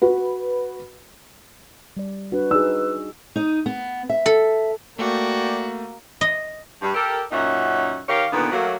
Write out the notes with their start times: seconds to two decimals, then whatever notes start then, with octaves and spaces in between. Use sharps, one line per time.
0.02 F#4 B4
1.97 G3 D5
2.32 D4 F#4 B4
2.51 D#4 F#4 G#4 E6
3.36 D#4 D#5
3.66 B3
4.09 E5
4.26 A4
4.99 A3 A#3 F#4 D5 G5
6.21 D#5
6.81 G2 G3
6.94 G4 A4 A#4
7.32 F#2 A#2 C#4 D#4 E5 F#5
8.08 D#3 G4 A#4 C#5 F5
8.32 A#2 D3 D#3 B3
8.52 F#3 A3 A#3